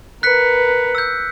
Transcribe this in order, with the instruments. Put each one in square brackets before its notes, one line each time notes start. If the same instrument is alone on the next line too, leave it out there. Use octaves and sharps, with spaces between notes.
[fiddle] A#4 B4 [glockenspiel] F#6 B6 C#7
[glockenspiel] E6 G6